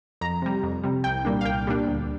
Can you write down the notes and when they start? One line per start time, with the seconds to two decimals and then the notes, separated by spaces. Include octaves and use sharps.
0.21 F2 A#5
0.42 C3 G3
0.63 F2
0.84 C3 G3
1.04 C2 G5
1.25 A#2 G3 A#3 D4
1.41 F5
1.45 C2 G5
1.67 A#2 G3 A#3 D4
1.87 D2